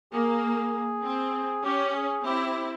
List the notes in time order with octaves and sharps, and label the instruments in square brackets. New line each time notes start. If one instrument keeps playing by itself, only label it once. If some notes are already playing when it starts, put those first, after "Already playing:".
[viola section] A#3 [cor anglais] G#4
[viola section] C4
[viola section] C#4 [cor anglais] G4
[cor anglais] G4
G#4
[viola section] C4 E4 [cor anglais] G4
[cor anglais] G4